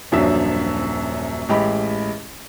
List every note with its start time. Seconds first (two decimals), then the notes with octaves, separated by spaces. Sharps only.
0.12 D#1 F#2 F3 F#3 D4 E5
1.49 A1 G#3 G4 D#5 B5